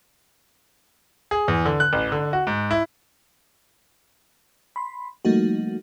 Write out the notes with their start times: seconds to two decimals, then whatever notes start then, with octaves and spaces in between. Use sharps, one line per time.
1.31 G#4
1.48 E2
1.65 D3
1.80 F#6
1.93 A1
2.12 D3
2.33 F#4
2.47 G#2
2.71 E4
4.76 B5 C6
5.25 F3 G3 A3 A#3 D#4 F#4